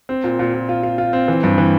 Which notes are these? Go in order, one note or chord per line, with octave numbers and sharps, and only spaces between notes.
C4
A#2
A#2
A#2
F4
F4
F4
C4
E3
G2
E3